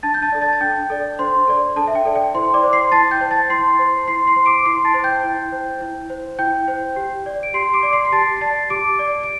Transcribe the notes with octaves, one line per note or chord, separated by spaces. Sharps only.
D4 A5 A6
G6
A5 A6
A4 D5
A5 A6
A6
D4 G5 G6
A4 D5
D4 C5 C6
A4 D5
D4 A4 A5
E5
G5
A4 D5
G5
E4 C5 C6
D5 D6
C5
C6 C7
E4 A5 A6
G5 G6
C5
A5 A6
E4 C6 C7
C5
E4 C6 C7
C6 C7
C5
D6 D7
E4 C6 C7
A5 A6
C5
G5 G6
E4
C5
E4
C5
E4 G5 G6
C5
G4
D5
D7
G4 C6 C7
D6 D7
D5
C6 C7
C7
G4 A5 A6
C7
D5 A5 A6
G4 D6 D7
D5
D7